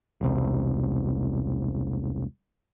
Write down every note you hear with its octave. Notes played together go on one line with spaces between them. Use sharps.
E1 C2